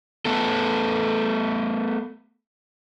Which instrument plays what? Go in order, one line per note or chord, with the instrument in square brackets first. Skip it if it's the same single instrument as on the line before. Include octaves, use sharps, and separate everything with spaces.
[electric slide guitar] A3 B3 A4